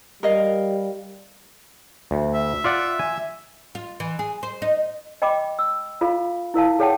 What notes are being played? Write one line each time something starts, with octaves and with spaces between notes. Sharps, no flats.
G3 A#4 D#5 F5
D2
E5
F4 D5 F#5
G#5
F4
E3
G#4
C5
D#4
D#5 G5 B5 D6
E6
F4 A4 F5 B5
E4 A#4 F5 A5
G#4 A4 C#5 F#5 G5 A5